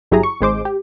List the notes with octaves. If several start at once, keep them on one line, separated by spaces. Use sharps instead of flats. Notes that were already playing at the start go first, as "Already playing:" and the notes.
G1 F#3 E4 G4 G#4 A#5
C#6
G#1 G#3 C5 D6
G4